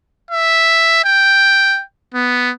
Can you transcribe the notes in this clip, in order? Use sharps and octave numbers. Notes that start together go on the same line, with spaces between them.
E5
G5
B3